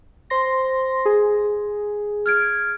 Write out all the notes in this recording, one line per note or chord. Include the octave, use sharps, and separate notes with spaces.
C5 C6 A#6
G#4
F6 G#6 D7